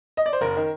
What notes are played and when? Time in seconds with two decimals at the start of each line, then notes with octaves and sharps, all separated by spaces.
0.17 D#5
0.26 D5
0.33 C5
0.41 F#1 A#4
0.56 D#3